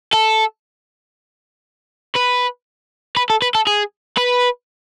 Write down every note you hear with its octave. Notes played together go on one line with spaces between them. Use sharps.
A4
B4
B4
A4
B4
A4
G#4
B4